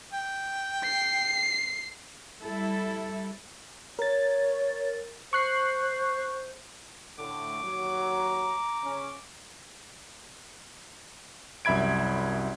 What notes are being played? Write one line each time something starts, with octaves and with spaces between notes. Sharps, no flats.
G5
C7
G3 E4 A4
A#4 C#5 A6
C5 C#6 F#6 C7
A2 D3 A3 D6
D#2 F#3
A#5
C#3 C#4
C2 F#2 E5 B5 G#6 D7